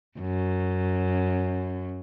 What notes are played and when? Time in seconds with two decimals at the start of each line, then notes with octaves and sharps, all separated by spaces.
0.20 F#2